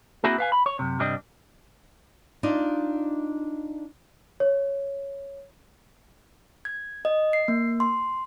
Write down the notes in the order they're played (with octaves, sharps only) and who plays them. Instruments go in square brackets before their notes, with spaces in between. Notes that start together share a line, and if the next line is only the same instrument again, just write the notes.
[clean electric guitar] A#3 C4 E4 F#4 G#4
B4 F5 G#5
B5
C#5
F#2 C3
C2 G2 G3 C4 D4 D#5
[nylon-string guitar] D4 D#4 F4 D5
[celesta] C#5
[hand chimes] G#6
D#5
C7
A#3
C6